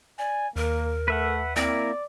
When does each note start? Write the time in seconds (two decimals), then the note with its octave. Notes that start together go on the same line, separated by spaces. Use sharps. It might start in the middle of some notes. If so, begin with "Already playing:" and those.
0.19 D5 G#5
0.56 D#2 A#3 A#4
1.08 A3 B4 E5 F#5
1.56 A#3 C4 E4 A#4 D5